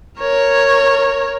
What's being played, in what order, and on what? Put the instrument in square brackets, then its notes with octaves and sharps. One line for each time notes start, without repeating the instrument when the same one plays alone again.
[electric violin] A#4 C#5